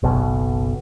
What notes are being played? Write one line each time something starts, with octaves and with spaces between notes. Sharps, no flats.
F#1 B1 B2